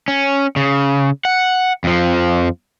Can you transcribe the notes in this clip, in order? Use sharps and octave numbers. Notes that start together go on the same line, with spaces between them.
C#4
C#3
F#5
F2 F3